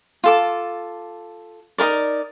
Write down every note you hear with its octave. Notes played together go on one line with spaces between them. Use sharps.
F4 A4 D6
D#4 F4 A#4 D5